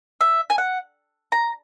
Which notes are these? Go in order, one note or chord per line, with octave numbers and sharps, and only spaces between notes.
E5
G#5
F#5
A#5